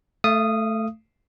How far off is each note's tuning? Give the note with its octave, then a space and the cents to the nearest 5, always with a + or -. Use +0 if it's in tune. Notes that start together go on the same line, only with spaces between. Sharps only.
A3 +0 F5 -40 D#6 -5